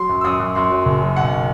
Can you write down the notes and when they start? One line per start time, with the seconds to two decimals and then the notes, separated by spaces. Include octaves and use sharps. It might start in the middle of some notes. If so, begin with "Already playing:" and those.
Already playing: F#3 C6
0.09 F#2
0.21 E6
0.24 F#2 D#6
0.40 F#2
0.55 F#2 C6
0.70 F#3
0.86 F#1
1.02 F#3
1.16 B1 F#5